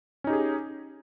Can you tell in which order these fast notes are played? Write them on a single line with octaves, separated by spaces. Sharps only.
C#4 D#4 G4 G#4